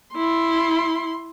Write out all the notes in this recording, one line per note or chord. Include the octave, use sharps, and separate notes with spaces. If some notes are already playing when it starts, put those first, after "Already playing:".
E4 C6